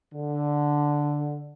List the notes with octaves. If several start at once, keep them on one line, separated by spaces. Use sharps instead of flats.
D3